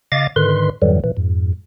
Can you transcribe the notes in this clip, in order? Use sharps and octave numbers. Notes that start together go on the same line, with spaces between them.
C#3 D#5 F5 D6 A6
G#2 D3 D#3 B4 C6
F2 G#2 D3 E3 F#3 G3
A#2 E3
F2 G#2